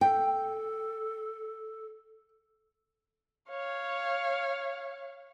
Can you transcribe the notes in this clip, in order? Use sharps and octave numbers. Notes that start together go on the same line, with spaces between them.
A4 G5
C#5 F5